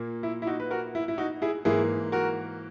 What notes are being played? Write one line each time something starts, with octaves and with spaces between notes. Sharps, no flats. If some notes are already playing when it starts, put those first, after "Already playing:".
Already playing: A#2 A#3
E4
E4
D#4 F#4
B4
F#4 A#4
E4
E4
D#4 F#4
E4 G#4
G#2 E3 A#3 E4 G#4
F#4 A#4